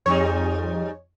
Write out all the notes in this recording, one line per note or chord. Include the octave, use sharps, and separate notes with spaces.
F2 G#2 G3 D#4 C#5